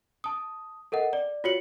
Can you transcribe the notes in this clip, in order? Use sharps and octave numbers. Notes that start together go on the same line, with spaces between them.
A5 D#6
A4 A#4 D#5 F#5
D5
F4 F#4 C#5 C#7 F#7